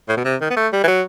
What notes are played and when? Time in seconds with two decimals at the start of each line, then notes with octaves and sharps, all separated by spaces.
0.09 A2
0.17 B2
0.25 C3
0.41 D#3
0.50 B3
0.56 A3
0.73 G3
0.84 E3
0.87 F#3